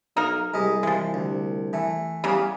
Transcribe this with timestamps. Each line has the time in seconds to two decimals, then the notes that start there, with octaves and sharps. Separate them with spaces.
0.17 B1 A#3 D#4 A#4
0.54 C2 G3 G#3 D#5
0.83 E3 F3 G#3
1.14 D2
1.73 E3 A3
2.24 C#3 E3 G3 A#3 B3